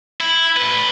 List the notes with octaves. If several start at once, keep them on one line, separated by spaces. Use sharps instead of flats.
E4
A2 B4